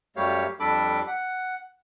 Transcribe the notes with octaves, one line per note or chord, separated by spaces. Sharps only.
F#2 G3 A3 G4 C#5 F5
F2 G3 D4 A4 B5 D6
F#5